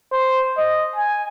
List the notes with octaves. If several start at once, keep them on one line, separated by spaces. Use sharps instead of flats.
C5
D#5
G#5